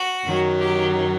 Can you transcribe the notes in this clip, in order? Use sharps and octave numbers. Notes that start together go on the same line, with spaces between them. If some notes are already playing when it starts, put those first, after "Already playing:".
Already playing: F#4
F#2 D#3 F#3
G4